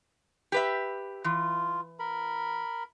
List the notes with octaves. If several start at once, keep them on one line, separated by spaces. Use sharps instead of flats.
G4 B4 E5
E3 F4
A#4 B5